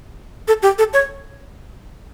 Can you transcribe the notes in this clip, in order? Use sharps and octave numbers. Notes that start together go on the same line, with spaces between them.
A4
G4
A4
C#5